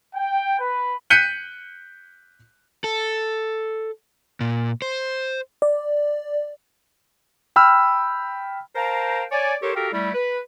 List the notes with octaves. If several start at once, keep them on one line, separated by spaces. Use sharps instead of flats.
G5
B4
F#6 G6 B6 C#7 D#7 G7
A4
A#2
C5
D5
G5 B5 E6 F6
A#4 C5 F5 G5 A5 A#5
C#5 D5 G#5
G4 A4 A#4 C5 C#5
F#4 G4 A4 A#4 F5 G5
G3 A3 E4
B4